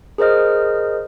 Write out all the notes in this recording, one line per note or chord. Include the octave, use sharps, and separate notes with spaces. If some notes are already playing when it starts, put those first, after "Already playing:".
G#4 A#4 C5 D#5 F6